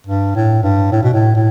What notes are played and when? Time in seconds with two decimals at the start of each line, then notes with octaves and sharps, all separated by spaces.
0.07 G2
0.35 A2
0.63 G2
0.92 A2
1.03 B2
1.13 A2
1.35 A2